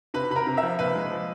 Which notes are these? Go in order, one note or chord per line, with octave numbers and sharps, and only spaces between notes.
C3 B4 B5
C3 B5
A#4 A#5
C3
E5 E6
F3
A#2 B4 B5
G#3
F3